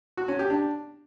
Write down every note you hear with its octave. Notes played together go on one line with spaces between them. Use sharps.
F#4
C#4
G4
D4